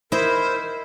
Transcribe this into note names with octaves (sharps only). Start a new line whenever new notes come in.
E4 A#4 C5 D#5 E5